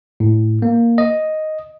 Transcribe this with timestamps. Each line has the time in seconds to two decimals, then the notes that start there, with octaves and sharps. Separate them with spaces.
0.20 A2
0.62 A#3
0.98 D#5